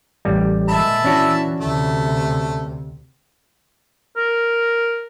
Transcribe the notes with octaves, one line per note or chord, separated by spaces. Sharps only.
A1 G3
A#2 G#3 E5 A5 B5
E3 C#4 D4 F#4
D2 C3 A3
A#4